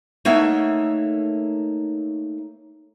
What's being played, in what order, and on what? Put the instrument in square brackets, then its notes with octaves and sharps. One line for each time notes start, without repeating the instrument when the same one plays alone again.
[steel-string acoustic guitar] A3 A#3 D#4 C#5 E5 F#5